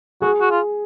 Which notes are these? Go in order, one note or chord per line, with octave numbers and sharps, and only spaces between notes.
F#4 G#4
F#4
F4